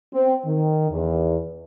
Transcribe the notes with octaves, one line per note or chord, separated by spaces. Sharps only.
C4
D#3
E2